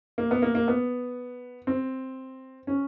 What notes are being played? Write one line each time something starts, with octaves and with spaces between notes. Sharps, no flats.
A#3
B3
A#3
A#3
B3
C4
C#4